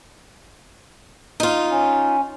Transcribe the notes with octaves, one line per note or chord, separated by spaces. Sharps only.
D#4 F4
C#4